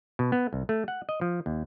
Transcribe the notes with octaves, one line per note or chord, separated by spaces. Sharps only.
B2
B3
C2
A3
F#5
D#5
F3
D#2